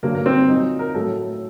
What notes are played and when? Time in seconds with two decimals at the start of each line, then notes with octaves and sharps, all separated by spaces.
0.03 G2 D3 F#3 A#3
0.15 A#3
0.26 C4
0.49 A#2 F#3 D#4
0.79 A#4
0.95 A2 F#3 A4